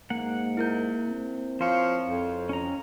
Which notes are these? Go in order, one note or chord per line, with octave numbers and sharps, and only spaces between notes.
G#2 A#3 F#5
E4 A#4 G6
C4
F3 C5 C#5
F2
C#4 A#5